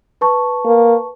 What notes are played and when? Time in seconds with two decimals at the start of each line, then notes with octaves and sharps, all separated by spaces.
0.21 B4 A5 C#6
0.64 A#3